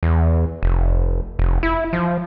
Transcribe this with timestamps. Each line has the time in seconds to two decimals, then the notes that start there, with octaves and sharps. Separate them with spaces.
0.03 E2
0.63 F1
1.39 F1
1.63 E4
1.93 F3